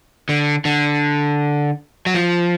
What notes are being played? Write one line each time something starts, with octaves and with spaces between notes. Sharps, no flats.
D3
D3
F#3
F3